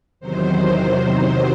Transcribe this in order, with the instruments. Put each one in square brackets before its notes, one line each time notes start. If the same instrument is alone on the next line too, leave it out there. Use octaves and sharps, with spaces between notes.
[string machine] E2 C3 D#3 F#3 C5